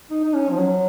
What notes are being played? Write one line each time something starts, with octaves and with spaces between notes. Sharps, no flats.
D#4
D#4
C#4
F3
F#3